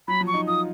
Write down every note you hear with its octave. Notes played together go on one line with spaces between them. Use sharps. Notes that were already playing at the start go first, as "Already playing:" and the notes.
F#3 B5
F3
C#6
D#4
F4 D#6